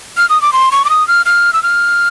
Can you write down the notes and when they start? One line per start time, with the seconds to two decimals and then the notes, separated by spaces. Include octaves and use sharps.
0.17 F6
0.29 D#6
0.42 D6
0.53 C6
0.72 C#6
0.85 D6
0.89 D#6
1.08 F6
1.26 F6
1.53 E6
1.63 F6